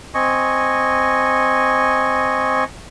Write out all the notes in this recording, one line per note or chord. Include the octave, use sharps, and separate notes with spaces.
C4 D#5 G#5 C#6